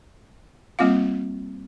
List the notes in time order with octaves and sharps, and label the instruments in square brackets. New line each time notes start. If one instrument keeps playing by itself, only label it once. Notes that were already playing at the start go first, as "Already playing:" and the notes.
[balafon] G3 A#3 C4 F4 F5